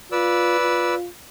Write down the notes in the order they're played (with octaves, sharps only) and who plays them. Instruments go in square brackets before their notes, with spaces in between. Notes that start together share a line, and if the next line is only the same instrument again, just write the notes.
[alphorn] F4 [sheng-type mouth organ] B4 D5 E6
[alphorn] F4